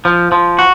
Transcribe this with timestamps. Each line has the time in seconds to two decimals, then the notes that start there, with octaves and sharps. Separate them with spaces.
0.05 F3
0.32 F3
0.59 F#4